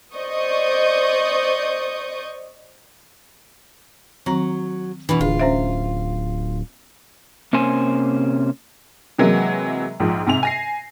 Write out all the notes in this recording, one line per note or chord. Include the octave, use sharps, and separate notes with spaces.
C5 D5 D#5 C#6 D#6 G6
D#3 F#3 C4 A#5
B2 E3 D4 B4 B5
D1 F4 G#4
C#4 C5 E5
C3 A#3 C#4 C5 G#5
C3 E3 F#3 G#3 A#3
A#1 G#2 F3
G#2 C3 G#5 F7
G#5 A#6 C7